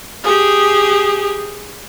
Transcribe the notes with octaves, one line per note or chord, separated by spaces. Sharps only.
G4 G#4